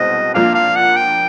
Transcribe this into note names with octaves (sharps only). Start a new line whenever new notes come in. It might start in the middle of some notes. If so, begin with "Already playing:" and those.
Already playing: C2 B2 G#3 C4 D#5
A#2 F3 A#3 D4 F5
F5
F#5
G5